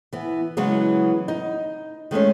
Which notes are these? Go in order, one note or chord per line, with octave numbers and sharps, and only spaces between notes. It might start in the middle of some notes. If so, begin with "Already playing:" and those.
E3 B3
C#3 E3 F#3 G#3 B3
D#4
D#3 G#3 A3 C#4